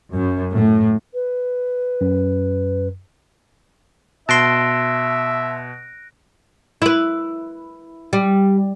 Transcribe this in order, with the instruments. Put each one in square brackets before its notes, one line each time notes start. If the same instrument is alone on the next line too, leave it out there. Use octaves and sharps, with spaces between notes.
[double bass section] F#2
A2
[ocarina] B4
[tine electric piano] F#2
[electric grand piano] B2 [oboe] E5 [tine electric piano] A5 C6 [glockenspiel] F#6 A#6 D7
[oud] E4 B4
G3